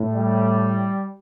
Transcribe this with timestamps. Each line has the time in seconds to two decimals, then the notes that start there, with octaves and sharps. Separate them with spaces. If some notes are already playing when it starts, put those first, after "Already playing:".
Already playing: A2
0.14 G3